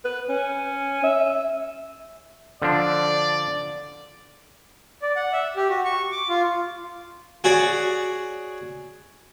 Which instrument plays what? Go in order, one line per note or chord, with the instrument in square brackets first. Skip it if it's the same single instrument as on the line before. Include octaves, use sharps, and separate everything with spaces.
[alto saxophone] B4
C#4
E5
[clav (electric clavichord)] D3 F3 D4 [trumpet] D5
[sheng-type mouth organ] D5
F#5
E5
G4
F#4
C#6
D6
F4
[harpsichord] F#4 G#4 C#5 D5